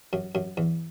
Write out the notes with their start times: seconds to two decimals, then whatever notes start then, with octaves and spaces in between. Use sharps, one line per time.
0.13 F#2
0.35 F#2
0.57 E2